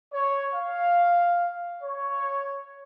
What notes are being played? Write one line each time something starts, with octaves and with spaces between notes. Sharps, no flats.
C#5
F5
C#5